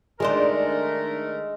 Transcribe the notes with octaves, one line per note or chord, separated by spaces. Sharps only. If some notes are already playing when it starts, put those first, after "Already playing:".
D#3 G#3 A3 D4 A#4 C5